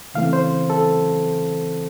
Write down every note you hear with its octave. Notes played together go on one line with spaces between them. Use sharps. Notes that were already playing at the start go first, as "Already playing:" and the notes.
C#3 E3 A3 C4 F5
C5
A4